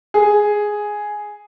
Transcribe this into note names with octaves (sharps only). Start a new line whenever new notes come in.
G#4